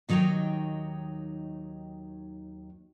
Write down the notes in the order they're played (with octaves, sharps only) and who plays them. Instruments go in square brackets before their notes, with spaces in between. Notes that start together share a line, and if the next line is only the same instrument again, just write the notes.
[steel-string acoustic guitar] D#2 D#3 F#3 D#4 C#5 G5